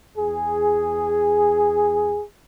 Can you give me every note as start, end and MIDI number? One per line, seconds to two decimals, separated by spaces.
0.17 2.23 40
0.17 2.23 68